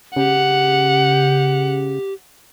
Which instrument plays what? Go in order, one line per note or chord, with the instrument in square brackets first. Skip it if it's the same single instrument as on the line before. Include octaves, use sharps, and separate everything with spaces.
[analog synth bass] C#3 [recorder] G4 [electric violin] F#5